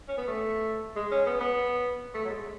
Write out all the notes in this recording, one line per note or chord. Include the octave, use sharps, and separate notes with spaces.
C#4
B3
A3
G#3
C#4
B3
B3
A3
F#3
G#3